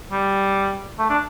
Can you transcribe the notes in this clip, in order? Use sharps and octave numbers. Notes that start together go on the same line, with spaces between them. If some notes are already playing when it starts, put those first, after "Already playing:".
G3
A3
D4